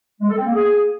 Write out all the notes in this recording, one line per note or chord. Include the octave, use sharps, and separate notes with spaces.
G#3
A4
C4
A#3
G#4